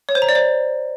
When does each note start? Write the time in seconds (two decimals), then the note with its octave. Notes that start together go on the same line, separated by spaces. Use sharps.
0.09 C#5
0.15 C5
0.22 A#5
0.29 D5
0.35 C5